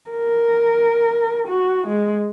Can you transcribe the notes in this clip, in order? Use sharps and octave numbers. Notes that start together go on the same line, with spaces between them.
A#4
F#4
G#3